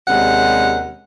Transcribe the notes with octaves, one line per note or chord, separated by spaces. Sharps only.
D#2 C3 G3 G#3 C#4 F#5